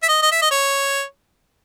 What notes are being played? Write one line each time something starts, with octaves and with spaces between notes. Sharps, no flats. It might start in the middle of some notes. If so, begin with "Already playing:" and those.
E5
D#5
D#5
E5
D#5
C#5